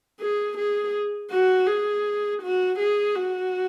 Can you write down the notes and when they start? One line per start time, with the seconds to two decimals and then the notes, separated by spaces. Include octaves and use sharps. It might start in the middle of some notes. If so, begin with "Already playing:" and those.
0.20 G#4
0.58 G#4
1.31 F#4
1.67 G#4
2.42 F#4
2.79 G#4
3.15 F#4